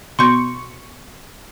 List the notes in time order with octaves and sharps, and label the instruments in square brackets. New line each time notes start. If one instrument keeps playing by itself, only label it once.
[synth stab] B2 C#6 [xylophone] C6 G6